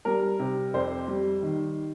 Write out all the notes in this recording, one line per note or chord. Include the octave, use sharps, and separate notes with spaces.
G3 A#4
C3
F2 C5
G3
D#3